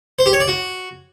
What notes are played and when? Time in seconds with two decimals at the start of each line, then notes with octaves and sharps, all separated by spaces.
0.19 C5
0.26 G4
0.33 C#5
0.40 D5
0.48 F#4